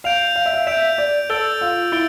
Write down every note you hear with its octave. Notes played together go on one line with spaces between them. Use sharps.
F5 G6 D7 F7
F5
E5
F5
E5 G6 D7 F7
D5
A4 E6 A6 D7 G7
F4
E4 E6 A6 D7 G7